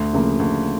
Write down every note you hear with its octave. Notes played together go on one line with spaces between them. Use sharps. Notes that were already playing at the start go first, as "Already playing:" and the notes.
Already playing: D2
C#3 F3 A#3
D2